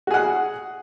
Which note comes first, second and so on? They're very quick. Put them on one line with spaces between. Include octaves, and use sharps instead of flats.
F#4 G#4 F#5